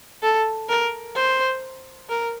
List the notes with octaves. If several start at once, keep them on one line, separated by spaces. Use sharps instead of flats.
A4
A#4
C5
A#4